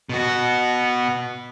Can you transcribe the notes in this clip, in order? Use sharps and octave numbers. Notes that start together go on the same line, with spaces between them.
B2 F#4